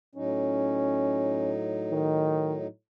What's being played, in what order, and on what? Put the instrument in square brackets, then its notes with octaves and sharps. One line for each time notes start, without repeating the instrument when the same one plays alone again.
[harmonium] A2 F#3 D#4 [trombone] C#4
[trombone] D#3